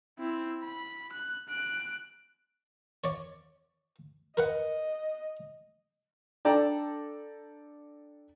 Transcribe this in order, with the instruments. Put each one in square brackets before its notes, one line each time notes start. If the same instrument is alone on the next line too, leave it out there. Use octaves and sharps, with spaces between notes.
[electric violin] C4 E4
B5
F#6
F#6 D7
[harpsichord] C#5 D5
[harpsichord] A#4 B4 F#5 [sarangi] D#5
[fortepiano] D4 A4 D5 G5 A5 A#5